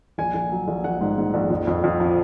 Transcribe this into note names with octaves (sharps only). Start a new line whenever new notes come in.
A#1 G#5
A#1
F#3
A#1
A#1 F#5
G#2
G#2
A#1
F2
F2
F2
F3